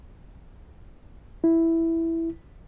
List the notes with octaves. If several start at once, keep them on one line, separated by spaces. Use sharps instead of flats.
E4